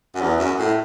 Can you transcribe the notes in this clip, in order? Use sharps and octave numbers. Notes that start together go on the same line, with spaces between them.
F#2
E2
F#2
A2